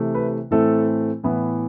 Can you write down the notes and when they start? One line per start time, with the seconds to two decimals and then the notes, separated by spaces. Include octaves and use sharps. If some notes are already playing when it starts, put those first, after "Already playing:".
Already playing: C3 E3 A3
0.14 B4
0.51 A2 E3 A3 C4 A4
1.23 A2 E3 B3